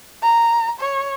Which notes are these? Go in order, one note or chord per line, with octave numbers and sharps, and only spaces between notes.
A#5
C#5